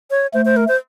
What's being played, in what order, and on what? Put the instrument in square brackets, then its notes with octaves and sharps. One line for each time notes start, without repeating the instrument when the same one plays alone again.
[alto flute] C#5
[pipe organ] A3 [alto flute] C5
[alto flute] C5
A#4
C5